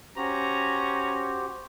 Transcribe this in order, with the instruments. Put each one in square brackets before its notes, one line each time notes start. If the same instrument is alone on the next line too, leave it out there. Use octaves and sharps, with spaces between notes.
[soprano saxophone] C#4 [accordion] F#4 G4 C5 [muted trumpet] A#5